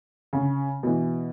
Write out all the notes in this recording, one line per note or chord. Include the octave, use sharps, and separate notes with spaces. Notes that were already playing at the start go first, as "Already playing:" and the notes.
C#3
B2 E3